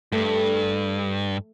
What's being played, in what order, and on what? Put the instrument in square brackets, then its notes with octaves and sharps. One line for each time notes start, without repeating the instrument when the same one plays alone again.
[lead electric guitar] G2 [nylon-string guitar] A3